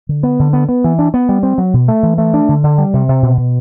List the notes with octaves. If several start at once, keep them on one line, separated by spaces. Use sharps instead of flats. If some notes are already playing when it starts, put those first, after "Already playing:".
D3
B3
D3
B3
B3
E3
D4
B3
G3
C4
F#3
B2
A3
E3
A3
D4
D3
D3
G3
C3
C3
B2
B2